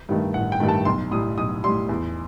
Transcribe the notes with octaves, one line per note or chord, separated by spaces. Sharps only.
G2 D#3 A3
A1 F#5
G5
G2 D#3 A3
A5
B1 C6
A2 G3 D#6
B1 D#6
A2 G3 C6
E2